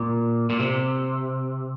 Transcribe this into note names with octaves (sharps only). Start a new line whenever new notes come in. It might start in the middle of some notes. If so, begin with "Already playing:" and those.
Already playing: A#2
A#2
C3